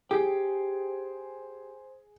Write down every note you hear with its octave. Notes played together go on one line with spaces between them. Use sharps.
G4 G#4 C5